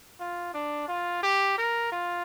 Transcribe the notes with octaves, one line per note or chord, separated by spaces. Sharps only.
F4
D4
F4
G4
A#4
F4